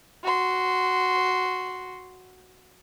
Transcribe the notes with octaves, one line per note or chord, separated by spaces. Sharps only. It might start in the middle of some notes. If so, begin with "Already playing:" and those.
F#4 C6